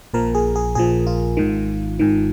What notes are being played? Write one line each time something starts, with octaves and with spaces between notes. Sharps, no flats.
A#1 A#2 F3 A#4
G#4
G#4
A#1 A#2 F3 G#4
F4
G#1 G#2 D#3
G#1 G#2 D#3